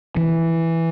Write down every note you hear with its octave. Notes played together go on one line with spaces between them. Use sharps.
E3